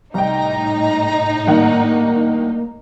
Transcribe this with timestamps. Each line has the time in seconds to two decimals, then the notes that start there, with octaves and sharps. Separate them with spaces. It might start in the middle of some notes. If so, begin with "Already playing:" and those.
0.14 C2 A2 D#4 G5 A#5
1.47 G2 D#3 A#3 F#5